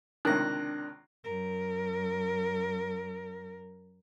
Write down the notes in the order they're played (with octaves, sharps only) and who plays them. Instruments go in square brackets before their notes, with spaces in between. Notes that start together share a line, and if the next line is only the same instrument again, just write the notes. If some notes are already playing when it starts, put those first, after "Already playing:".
[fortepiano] C#2 C3 D#3 [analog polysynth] D4 [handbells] F#6 A#6
[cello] F#2 A#4